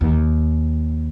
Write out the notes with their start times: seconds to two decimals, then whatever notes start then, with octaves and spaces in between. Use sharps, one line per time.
0.01 D#2